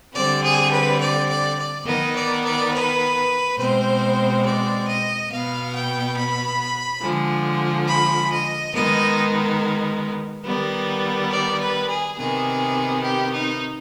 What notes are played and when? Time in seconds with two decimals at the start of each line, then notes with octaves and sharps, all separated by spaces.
0.13 D3 G3 C4 D5
0.43 G#4
0.71 B4
0.99 D5
1.28 D5
1.57 D5
1.85 D#3 B3 D#5
2.14 D5
2.43 D5
2.72 B4
3.57 B2 G#3 C4 C5
4.43 D5
4.86 D#5
5.30 B2 B3 F5
5.73 G5
6.15 B5
7.01 D3 F3 G#3
7.87 B5
8.31 D#5
8.73 D#3 G#3 B3 D#5
10.45 D#3 G3 B3
11.32 D5
11.60 B4
11.89 G#4
12.17 C3 D#3 B3 G#4
13.03 G4
13.32 D#4